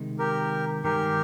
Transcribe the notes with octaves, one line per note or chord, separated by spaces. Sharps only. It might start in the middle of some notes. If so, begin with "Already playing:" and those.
Already playing: C3 D#3 G#3
G4 A#4
G2 D#3 G#3 D#4 G4 G#4 A#4